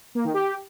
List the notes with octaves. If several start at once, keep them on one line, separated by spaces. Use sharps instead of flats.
A#3
D#3
G4